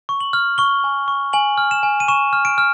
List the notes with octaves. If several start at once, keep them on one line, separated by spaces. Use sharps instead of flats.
C#6
F#7
F6
C#6 G7
G#5
C#6
G#5 F#7
F6
E7
G#5
D#7
C#6 E7
F6
D7
F6